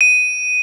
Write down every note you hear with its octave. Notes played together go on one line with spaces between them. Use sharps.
D#7